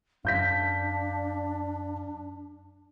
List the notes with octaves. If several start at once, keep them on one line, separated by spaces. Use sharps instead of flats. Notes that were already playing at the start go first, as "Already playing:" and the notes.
F#2 D4 F5 G6 B6